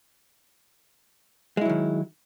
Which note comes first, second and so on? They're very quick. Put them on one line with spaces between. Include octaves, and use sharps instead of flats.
G#3 E4 F#3 D#3